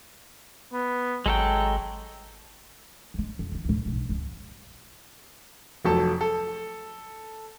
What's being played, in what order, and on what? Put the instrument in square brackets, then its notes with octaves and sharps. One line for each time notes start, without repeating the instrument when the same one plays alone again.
[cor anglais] B3
[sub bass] G#1 [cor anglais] F#3 [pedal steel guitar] G#3 A4 G5
[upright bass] G1 G#3
F2
D3 E3
D2 A2
B1 G2
C#2 C#4
[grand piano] F1 F#3 A4 A5
A4